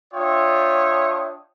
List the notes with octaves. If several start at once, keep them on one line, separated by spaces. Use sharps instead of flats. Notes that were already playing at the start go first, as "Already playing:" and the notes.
D4 F4 C#5 E5 G5 D#6